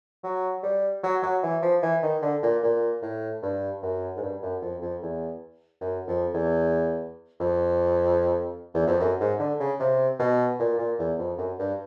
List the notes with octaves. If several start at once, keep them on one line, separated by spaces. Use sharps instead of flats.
F#3
G3
F#3
F#3
E3
F3
E3
D#3
D3
A#2
A#2
A2
G2
F#2
G#2
G2
F#2
F2
F2
E2
F#2
F2
E2
F2
E2
F2
F#2
G#2
D3
C#3
C3
B2
A#2
A#2
E2
F2
F#2
G2